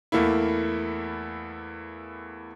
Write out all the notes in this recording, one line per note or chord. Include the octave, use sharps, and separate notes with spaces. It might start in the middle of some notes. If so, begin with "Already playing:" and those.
E2 A3 A#3 E4